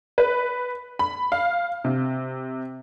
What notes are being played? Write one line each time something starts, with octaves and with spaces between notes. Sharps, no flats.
B4
B5
F5
C3